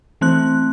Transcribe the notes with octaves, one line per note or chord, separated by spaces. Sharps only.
E3 A3 C4 F#6